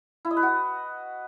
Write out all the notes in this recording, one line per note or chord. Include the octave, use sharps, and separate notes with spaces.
E4
D#5
B4
F#4